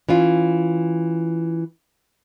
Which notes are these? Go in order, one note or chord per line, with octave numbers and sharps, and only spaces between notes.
E3 C#4 F4